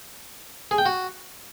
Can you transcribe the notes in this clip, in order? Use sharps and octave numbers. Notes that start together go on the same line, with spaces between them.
G#4
G5
F#4